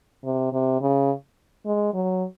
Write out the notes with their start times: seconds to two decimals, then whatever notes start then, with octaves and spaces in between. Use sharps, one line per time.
0.24 C3
0.53 C3
0.81 C#3
1.66 G#3
1.94 F#3